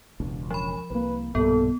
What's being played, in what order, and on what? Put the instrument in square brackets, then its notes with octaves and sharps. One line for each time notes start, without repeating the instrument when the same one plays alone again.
[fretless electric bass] E1 C#2 D4
[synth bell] F3 B5 [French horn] C#4
[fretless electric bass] C2 A#3 [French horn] B4
[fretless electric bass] B1 G2 A#2 [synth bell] B3 [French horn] A4